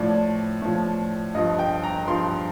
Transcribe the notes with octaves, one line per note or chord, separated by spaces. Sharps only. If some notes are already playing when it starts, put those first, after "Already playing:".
Already playing: A2 F3 D5
A2 F3
G2 F3 D#5
G5
A#5
G2 F3 C6